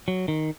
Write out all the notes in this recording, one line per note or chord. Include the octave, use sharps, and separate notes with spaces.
F#3
D#3